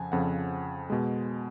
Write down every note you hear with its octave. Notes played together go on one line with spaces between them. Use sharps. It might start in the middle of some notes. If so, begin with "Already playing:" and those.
Already playing: F2 C#3 F3 F#5 G#5 A5
F2 C#3 F3 F#5
B2 G#3